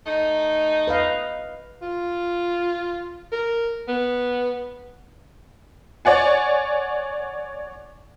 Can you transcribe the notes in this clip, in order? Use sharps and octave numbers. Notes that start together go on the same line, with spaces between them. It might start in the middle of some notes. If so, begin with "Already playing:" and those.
A3 D#4
B4 D#5 F5
F4
A#4
B3
C#5 D5 F#5 G#5